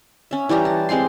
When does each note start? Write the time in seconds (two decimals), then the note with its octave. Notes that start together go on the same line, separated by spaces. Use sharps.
0.31 C#4 E5
0.49 E3 G3 G4 A#5
0.65 A5
0.89 G#3 C4 G4 C6